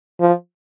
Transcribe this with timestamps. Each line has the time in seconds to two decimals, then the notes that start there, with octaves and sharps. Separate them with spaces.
0.21 F3